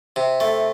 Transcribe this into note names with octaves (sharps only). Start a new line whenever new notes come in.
C3
A3